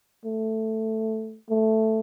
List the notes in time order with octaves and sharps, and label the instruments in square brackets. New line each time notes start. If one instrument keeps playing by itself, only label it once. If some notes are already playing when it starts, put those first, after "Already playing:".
[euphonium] A3
A3